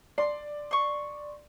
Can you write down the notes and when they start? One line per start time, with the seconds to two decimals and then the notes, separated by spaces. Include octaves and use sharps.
0.18 D5 C6
0.71 C6 C#6